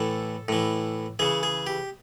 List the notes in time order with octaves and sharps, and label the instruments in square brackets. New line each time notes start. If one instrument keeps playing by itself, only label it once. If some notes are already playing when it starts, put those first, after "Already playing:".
Already playing: [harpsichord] A2 E3 A4
A2 E3
C#3 E3 G#4
G#4
G4